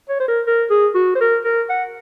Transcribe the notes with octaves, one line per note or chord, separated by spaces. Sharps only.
C#5
C5
A#4
A#4
G#4
F#4
C5
A#4
A#4
F#5